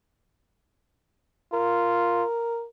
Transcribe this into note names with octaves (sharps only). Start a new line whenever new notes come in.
F4 A#4